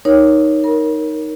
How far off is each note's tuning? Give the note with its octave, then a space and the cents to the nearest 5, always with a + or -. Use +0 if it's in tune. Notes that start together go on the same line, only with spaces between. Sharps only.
D#4 +0 A#4 +25 C#5 +0
A#4 +0 B5 -40